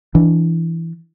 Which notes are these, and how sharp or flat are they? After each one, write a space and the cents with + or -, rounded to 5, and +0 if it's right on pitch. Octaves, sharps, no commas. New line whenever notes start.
E3 +0 D4 +0